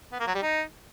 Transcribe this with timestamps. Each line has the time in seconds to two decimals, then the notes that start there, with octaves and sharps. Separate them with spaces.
0.12 B3
0.20 A#3
0.27 F#3
0.35 G3
0.42 D#4